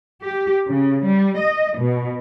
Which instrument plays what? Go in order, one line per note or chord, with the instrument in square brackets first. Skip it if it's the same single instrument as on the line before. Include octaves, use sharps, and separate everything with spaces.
[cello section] G4
C#3
G3
D#5
B2